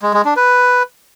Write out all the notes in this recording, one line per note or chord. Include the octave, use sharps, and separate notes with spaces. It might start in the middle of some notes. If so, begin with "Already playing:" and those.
G#3
G#3
D4
B4